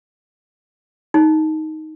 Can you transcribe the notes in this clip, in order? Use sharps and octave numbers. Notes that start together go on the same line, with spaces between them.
D#4